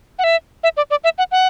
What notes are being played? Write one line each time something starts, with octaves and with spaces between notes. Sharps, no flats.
F#5
E5
E5
D5
D5
E5
F#5
F#5